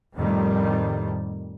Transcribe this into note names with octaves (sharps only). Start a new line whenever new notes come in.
F2 A2 D#3 G3